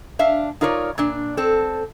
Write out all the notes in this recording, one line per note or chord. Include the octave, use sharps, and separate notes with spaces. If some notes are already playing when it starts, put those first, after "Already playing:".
D4 E5 F5
D#4 F4 A#4 C#5 D5
A#2 D4
C4 A4